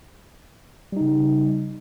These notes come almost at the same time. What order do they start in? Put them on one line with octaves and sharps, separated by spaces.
G3 D#4 C#3